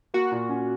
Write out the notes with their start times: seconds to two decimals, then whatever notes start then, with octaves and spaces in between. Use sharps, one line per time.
0.14 A#3 F#4
0.32 A#2
0.49 C#4